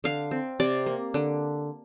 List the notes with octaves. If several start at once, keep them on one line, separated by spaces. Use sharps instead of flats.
D3 F5
C4
C3 D5
A#3
D3